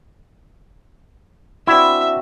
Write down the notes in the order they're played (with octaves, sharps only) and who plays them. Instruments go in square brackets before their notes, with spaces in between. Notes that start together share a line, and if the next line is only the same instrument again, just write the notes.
[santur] C4 D4 F#4 [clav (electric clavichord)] E4 [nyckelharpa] E5